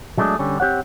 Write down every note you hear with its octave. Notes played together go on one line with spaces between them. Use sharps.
F#3 G#3 A3 C4 D4 G#4
D3 G3 C#4
C4 G4 C#5 F#5